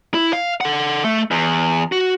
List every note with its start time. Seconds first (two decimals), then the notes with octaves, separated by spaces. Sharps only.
0.14 E4
0.33 F5
0.61 A4 F#5
1.04 A3
1.31 E2
1.92 F#4